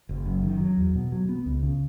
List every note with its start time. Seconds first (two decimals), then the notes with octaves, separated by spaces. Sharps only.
0.09 F#1
0.26 F#2
0.43 D#3
0.61 F#3
0.78 E2
0.95 B2
1.12 F#3
1.29 B3
1.46 C#2
1.63 C#3